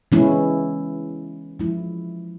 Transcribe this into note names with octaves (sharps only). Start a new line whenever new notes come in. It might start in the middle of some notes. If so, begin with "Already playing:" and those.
E3 G#3 C#4 E4
F3 G#3 E4